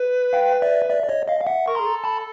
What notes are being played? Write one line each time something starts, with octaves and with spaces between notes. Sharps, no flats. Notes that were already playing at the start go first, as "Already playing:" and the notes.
Already playing: B4
F5 G5
D5 E5
D5 E5
D5
C#5 D#5
D#5 F5
F5
E5 F#5
A#4 C#6
G#4 A#5 C6
A4
A5 B5